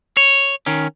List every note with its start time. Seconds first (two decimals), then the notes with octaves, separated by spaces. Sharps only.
0.17 C#5
0.66 D#3 C#4